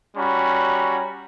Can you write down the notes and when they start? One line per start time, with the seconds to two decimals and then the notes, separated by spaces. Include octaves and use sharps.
0.16 G3 C#4 F#4 A#5 B5